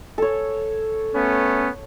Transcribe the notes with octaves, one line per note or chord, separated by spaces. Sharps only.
A4 C#5
A3 B3 C#4